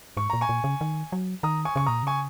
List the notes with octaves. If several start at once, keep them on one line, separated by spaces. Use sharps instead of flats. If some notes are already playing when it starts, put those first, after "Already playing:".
G#2 C#6
A#2 A#5
G#5 C#6
A#2
C#3
D#3
F#3
D#3 A#5 D#6
G#5 C#6
C#3 C#6
A#2 A#5 D#6
C#3 G#5 C#6